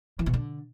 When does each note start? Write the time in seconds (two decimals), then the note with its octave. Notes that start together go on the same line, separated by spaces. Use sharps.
0.19 E3
0.26 B2
0.34 D3